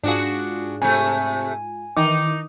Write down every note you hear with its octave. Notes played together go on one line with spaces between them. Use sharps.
G#2 D4 F4 F#4 G#4
C3 A3 G#5
D#3 E3 D#4 D6